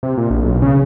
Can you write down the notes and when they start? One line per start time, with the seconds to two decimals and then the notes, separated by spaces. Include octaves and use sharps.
0.03 C3
0.18 A#2
0.30 A#1
0.43 B1
0.62 C#3